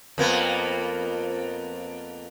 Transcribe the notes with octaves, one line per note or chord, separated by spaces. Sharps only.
F2 A#3 B3